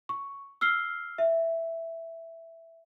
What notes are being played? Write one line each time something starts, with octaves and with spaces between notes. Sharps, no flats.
C#6
E6 F6 C7 G7
E5